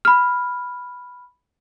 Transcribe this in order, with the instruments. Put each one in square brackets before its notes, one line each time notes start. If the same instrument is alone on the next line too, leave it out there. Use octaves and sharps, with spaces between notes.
[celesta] B5 F6